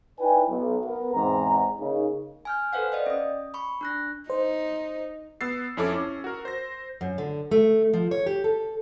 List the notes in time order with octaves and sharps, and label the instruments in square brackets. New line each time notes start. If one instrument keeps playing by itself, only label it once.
[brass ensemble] D#4 E4 B4 D5 G5 G#5
B1
B3 A#4
E2 G#2 C4 A#5
C#3 A#3 D#4
[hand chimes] G#5 F6 G6
A4 B4 C5 F5 F#5
D5 D#5 G5
C#4 D#6
B5 C#6
D4 F#6 A#6
[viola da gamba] D#4 [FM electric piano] C5
[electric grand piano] B3 E6 A6 C7
F2 C#4 E4 A4 D6
C#4
F#4 A#4
C5 A#6
[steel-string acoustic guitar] F#2
D3
A3
F3
C#5
G4
A4